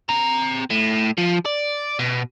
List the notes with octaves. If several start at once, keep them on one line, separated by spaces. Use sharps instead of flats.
C4 A#5
A2
F3
D5
B2